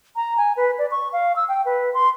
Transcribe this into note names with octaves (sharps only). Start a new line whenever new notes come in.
A#5
G#5
B4
D5
C#6
F5
E6
G5
B4
C6